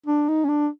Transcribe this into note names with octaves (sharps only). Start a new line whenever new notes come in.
D4
D#4
C#4
D4